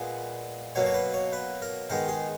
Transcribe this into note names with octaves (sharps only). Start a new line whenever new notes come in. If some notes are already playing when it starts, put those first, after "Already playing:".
Already playing: A#2 G#3 B3 B4
B2 F#3 A#3 C#5
C#5
B4
C#5
B4
A#4
D#3 G#3 B3 A#4
G#4